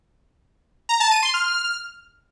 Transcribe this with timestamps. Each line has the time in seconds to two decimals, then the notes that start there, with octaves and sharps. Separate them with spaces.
0.89 A#5
1.00 A5
1.11 D#7
1.23 C6
1.34 F6